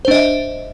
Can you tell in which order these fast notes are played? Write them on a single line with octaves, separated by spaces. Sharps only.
C5 D4 D#5 E5